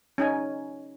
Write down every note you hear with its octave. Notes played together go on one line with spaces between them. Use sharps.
C#4 D#4 G#5